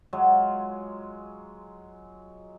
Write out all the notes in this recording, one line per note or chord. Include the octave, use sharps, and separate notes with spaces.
F#3 G#3 F4